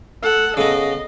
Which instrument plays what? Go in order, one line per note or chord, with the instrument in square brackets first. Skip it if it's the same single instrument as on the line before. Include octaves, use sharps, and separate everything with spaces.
[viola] A4 F#5
[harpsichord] C#3 B3 [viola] D#5